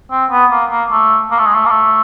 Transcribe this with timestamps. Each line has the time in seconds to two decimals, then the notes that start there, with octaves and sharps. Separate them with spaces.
0.11 C4
0.31 B3
0.51 A#3
0.70 A#3
0.90 A3
1.31 A#3
1.39 A3
1.46 G#3
1.54 A3
1.66 A#3
1.70 A3